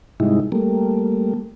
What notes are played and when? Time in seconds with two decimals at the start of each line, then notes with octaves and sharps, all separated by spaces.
0.20 G#2 C3 G3 G#3 D#4 E4
0.52 G3 A3 A#3